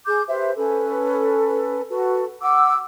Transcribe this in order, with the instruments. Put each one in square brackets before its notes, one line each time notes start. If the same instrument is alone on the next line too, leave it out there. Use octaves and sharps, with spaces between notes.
[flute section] G#4 D6 G6
G4 B4 C5 E5
C#4 A4 B4
F#4 A4 B4
F#5 D6 E6